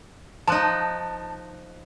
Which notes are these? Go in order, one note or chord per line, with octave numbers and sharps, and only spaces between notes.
F3 D#4 A5 F#6